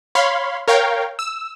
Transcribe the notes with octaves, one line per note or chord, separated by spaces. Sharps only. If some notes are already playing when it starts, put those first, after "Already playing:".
C#5 F5 B5 C6
A#4 C#5 F5 G5
E6